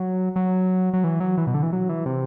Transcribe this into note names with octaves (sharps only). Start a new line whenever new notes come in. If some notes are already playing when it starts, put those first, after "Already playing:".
Already playing: F#3
F#3
F#3
E3
F#3
E3
B2
D3
E3
F#3
E3
C3